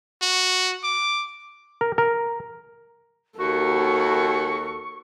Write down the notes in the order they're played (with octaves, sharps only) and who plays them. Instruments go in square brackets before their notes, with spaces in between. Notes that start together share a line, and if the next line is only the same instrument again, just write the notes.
[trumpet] F#4
D6
[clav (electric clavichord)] A#4
A#4
[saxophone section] D#2 F#4 [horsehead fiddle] A4 A#4 [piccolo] C#6